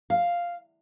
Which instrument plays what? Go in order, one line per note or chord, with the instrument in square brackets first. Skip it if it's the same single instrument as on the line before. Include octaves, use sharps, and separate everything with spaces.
[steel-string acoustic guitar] F5